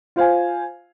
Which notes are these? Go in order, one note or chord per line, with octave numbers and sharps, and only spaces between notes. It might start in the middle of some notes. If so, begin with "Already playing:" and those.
F4 C5 F5 G#5